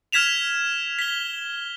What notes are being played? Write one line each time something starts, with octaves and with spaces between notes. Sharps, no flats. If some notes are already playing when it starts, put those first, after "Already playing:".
F6 G#6 B6 E7 F7
B6 G7